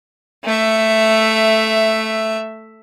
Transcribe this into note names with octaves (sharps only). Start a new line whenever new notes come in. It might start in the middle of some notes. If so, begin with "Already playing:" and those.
A3 E5